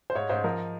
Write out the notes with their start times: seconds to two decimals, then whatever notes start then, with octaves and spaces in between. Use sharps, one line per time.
0.10 C5
0.15 G#2 C#5
0.29 G#2 C5
0.44 F3 A#4